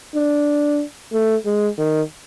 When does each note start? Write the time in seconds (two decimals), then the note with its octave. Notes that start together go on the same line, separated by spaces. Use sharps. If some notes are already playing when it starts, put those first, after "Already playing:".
0.15 D4
1.13 A3
1.46 G#3
1.78 D#3